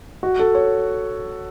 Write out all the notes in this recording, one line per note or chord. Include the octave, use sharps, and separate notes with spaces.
F#4
A4
C#5